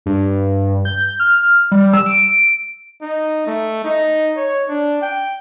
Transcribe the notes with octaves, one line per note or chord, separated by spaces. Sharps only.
G2
G6
F6
G3
E6
D7
D#4
A3
D#4
C#5
D4
G5